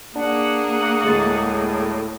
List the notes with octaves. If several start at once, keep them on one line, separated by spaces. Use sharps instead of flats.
A#3 D4 G#4 F#5
D2 A2 G#3 A6